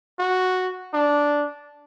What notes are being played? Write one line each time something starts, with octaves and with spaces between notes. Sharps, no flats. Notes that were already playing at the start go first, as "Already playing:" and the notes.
F#4
D4